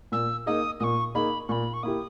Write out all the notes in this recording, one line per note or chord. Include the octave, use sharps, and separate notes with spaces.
A#2 E6
A#3 D#4 G#4 D#6
A#2 C#6 D#6
A#3 D#4 G#4 B5
A#2 B5 C#6
C#6
A#3 E4 G4 D#6